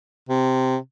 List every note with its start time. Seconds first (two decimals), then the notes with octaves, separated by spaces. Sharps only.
0.29 C3